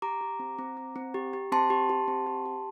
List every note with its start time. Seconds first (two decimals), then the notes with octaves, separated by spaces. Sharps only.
0.02 G4 A#5 D6
0.21 G4
0.39 C4
0.59 C4
0.77 C4
0.96 C4
1.14 G4
1.33 G4
1.52 C4 A5 C6
1.70 G4
1.89 G4
2.08 C4
2.27 G4
2.46 G4